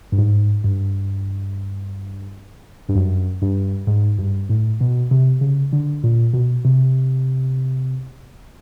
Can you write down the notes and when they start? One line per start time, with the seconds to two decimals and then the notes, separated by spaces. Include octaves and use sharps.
0.12 G2
0.18 G#2
0.64 G2
2.89 G2
2.95 F#2
3.42 G2
3.87 G#2
4.19 G2
4.49 A2
4.80 B2
5.11 C3
5.41 C#3
5.72 D3
6.04 A#2
6.34 B2
6.65 C3